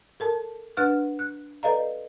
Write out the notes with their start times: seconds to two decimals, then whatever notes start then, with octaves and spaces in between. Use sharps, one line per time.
0.20 A4 A#4 A5
0.77 D4 B4 F#5 F6 F#6
1.19 F#6
1.63 A4 B4 D5 D#5 F5 A#5